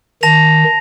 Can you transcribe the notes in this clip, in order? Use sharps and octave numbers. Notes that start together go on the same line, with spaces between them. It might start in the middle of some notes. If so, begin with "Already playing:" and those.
D#3 A5 A#6 F7